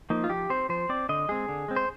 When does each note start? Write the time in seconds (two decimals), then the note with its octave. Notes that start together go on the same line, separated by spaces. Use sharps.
0.10 F3 A#3 D#4
0.24 F4
0.30 F3 G4
0.50 C4 C5
0.69 F3 C5
0.89 C4 D5
1.09 D3 D#5
1.29 G#3 C4 G#4
1.49 D3
1.68 G#3 C4
1.76 C5